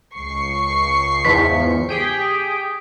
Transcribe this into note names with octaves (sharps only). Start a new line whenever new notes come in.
C#2 C#6 C7
E2 G#2 F3 B6
G4 G#4 G5